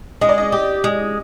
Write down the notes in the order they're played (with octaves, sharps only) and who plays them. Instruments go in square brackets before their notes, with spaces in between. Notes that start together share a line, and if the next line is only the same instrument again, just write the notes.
[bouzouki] G#3 [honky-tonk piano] D#5
[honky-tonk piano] D5
D#5
[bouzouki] G4
G#3